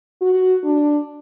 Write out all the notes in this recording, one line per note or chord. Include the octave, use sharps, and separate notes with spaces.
F#4
D4